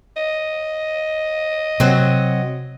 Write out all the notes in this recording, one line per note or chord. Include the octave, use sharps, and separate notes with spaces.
D#5
C3 F#3 C4